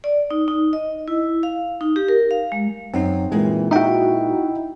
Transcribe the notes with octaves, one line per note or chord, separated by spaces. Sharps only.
D5
D#4
D#4
D#5
E4
F5
D#4
G4
A#4
F5
G#3
F#2 C4 D#4
A#2 E3 G#3
D#4 E4 F#4 E5 G5